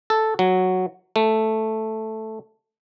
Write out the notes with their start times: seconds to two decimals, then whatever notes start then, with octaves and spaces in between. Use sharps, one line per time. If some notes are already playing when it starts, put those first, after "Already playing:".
0.10 A4
0.39 F#3
1.16 A3